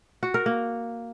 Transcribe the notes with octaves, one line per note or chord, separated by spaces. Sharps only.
F#4
A#4
A#3